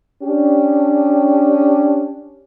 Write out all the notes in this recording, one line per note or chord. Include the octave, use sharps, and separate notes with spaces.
C#4 D4 G4